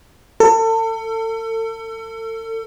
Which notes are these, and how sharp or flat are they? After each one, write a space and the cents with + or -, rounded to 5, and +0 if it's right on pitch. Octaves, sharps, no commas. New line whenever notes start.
A4 +35